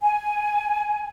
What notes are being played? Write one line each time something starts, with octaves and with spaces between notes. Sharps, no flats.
G#5